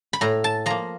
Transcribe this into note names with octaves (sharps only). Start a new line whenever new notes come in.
B5
A2 A#5
A5
F3 A#3 A#5